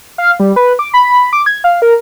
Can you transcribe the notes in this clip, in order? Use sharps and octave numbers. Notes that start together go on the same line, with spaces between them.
F5
G3
B4
D6
B5
D6
G#6
F5
A#4